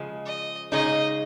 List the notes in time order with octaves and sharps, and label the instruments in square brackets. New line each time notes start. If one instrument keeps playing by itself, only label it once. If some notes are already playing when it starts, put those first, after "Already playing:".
Already playing: [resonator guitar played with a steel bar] C#3 F3 G#3
[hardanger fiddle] D#5
[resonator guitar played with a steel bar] C#3 G#3 D#4 [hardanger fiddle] D#5